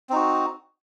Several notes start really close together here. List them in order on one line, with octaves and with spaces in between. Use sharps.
C4 D#4 F#4